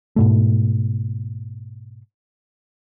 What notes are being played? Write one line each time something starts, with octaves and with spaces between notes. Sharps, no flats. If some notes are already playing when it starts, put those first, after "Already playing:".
G#2 B2 A3